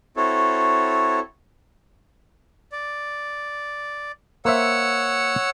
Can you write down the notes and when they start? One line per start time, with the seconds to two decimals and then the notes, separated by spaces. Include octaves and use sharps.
0.17 C4 E4 F#4 A4 C#5
2.72 D5
4.45 A#3 C5 C#5 E5 F#5 E6